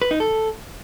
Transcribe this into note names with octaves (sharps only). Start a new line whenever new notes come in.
B4
D#4
A4